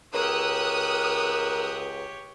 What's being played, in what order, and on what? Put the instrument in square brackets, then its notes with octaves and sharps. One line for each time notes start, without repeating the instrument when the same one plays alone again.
[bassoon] C#2 [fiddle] G4 C#5 [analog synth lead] A#4 [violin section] D#6 E6 F#6